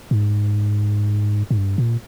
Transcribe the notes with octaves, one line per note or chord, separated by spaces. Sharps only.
G#2
G#2
G2
A#2